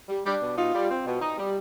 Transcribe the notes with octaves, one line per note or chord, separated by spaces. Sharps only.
G3
G3 D4 G4
B2
D#4 F4
G3
C4
B2
D#4
G3